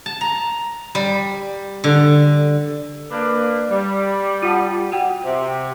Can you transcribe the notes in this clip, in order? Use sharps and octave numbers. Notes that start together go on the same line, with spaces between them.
A5
A#5
G3
D3
A#3 D4 B4
G3
F4 F#5 A5
F#4 F#5 G5
C3